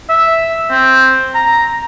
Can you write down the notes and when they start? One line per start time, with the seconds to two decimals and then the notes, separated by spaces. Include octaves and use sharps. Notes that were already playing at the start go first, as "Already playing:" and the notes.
0.10 E5
0.71 C4
1.35 A#5